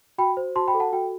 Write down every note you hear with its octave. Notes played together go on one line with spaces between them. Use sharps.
F#4 G5 B5
C5
F#4 A5 C6
G5 B5
A4
F#5 A5
F#4 G5